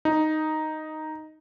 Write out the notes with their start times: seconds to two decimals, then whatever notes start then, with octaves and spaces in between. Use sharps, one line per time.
0.05 D#4